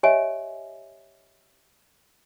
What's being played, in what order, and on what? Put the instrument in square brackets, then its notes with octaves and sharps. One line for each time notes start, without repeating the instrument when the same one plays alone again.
[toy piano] G4 C#5 D#5 E5 G#5